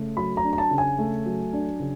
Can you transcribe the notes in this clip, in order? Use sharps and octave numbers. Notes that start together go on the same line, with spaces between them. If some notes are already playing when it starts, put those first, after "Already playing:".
Already playing: C#3 A3
F#3 B5
A#5
D4
A#5
A5
C#3
G#5
A3
F#3
D4
C#3